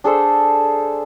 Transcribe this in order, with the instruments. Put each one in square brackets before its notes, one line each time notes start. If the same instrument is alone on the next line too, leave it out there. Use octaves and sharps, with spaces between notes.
[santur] D4 G#4 A4 C5